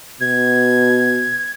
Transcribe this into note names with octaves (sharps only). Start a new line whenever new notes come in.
B2 G#6